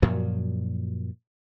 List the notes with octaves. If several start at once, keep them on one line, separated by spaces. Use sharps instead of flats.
F#2 A#2 F3 F#3